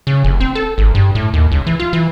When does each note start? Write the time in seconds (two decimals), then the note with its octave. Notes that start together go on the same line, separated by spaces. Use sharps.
0.07 C#3
0.24 F1
0.40 C4
0.55 A4
0.78 G#1
0.95 G2
1.15 A2
1.33 D#2
1.52 C#2
1.67 E3
1.80 F4
1.93 E3